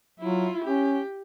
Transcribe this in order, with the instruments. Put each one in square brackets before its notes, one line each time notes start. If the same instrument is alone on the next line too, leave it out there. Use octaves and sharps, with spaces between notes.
[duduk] F#3 [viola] E4 F4
[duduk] C#4 [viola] G4